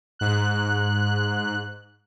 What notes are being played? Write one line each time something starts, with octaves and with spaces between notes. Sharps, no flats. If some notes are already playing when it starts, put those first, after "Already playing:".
G#2 F#6